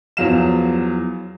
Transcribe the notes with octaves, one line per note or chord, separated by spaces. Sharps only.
E2 F3 F#3 F5 E7